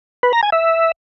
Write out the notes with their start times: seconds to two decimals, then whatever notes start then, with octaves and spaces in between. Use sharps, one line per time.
0.23 B4
0.33 A#5
0.43 G#5
0.52 E5